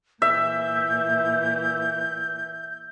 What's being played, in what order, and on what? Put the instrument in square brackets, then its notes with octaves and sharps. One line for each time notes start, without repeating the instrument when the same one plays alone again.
[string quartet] A#2 E3 [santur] E5 [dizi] G6